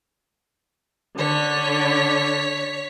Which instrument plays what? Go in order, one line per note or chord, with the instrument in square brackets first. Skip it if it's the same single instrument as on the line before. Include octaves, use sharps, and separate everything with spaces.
[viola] D3 [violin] C#5 B6